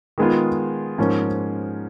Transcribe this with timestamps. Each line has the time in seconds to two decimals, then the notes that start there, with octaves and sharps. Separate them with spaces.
0.18 D#3 G#3 B3 F4 G#4
0.98 G#2 F3 A#3 C#4